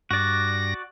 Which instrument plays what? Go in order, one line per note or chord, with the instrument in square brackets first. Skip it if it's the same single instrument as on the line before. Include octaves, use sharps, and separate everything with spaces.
[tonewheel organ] G2 A#6 [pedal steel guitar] F#4 D5